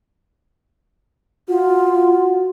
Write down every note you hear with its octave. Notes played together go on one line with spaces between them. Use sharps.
F4 F#4